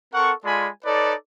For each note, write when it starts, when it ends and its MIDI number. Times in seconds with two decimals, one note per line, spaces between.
0.14 0.32 60
0.14 0.32 69
0.14 0.32 70
0.14 0.32 78
0.14 0.32 85
0.44 0.69 56
0.44 0.69 65
0.44 0.69 69
0.44 0.69 74
0.44 0.69 80
0.44 0.69 83
0.84 1.14 63
0.84 1.14 69
0.84 1.14 71
0.84 1.14 73
0.84 1.14 74